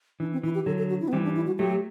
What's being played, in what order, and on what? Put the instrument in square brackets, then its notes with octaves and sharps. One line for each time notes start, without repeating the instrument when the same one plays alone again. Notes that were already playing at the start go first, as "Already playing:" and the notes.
[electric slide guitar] E3 [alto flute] D4
[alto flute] C4
[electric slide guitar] E3 [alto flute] E4
[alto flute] G4
[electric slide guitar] D3 F#3 [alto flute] A4
[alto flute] A4
F#4
E4
B3
[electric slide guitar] E3 G3 [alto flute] C4
[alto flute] D4
E4
F#4
[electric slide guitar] F#3 A3 [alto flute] G4